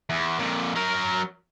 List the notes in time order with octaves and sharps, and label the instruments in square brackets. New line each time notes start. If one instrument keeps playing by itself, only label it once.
[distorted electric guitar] E2
F2 A#2
F#3 A#4